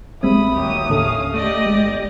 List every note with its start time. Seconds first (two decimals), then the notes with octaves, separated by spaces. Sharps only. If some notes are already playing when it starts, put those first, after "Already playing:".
0.23 A#1 G3 G#3 C4 E5 B5 D#6
0.56 D#2 F#3 G4
0.89 A2 D3 C#4 A4 F5
1.33 A3 G4 D5 D#5
1.66 G1 G#3